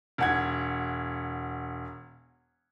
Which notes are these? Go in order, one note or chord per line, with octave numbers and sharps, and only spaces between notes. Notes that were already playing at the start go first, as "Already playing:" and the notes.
E1 F#5 G#6